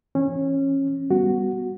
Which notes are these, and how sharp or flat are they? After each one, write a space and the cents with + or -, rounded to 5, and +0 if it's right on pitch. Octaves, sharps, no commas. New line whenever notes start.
E3 +20 C#4 -20
G3 +0 B3 +0 F#4 +0